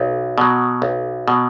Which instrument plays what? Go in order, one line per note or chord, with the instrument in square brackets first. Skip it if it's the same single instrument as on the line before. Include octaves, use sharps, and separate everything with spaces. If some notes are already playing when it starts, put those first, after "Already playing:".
Already playing: [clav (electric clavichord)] B1
B2 F#3
B1
B2 F#3